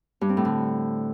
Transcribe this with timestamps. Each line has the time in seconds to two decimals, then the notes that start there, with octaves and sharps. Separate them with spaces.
0.21 G2
0.29 C4
0.37 A2
0.45 D3